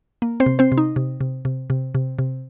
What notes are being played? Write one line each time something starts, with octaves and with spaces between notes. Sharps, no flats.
A#3
C4 C5
C3
C4 C5
C3
D#4
C3
C3
C3
C3
C3
C3